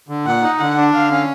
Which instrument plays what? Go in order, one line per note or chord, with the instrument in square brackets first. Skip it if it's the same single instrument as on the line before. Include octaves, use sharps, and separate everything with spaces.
[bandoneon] D3
[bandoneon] A#2 [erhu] F#5
[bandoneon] D#4
[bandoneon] D3 [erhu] F#5
[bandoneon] D4
[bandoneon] D3 [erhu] F5
[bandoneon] C#4